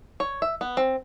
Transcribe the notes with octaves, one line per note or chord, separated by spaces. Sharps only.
C#5
E5
B3
C4